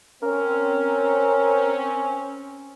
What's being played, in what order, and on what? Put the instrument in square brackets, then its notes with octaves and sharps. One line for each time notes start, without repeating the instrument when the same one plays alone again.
[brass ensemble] C4 C#4 [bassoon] A#4